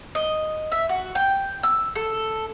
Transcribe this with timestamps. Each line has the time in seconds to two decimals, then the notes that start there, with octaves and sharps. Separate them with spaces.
0.15 D#5
0.72 E5
0.89 F#4
1.15 G5
1.63 E6
1.96 A4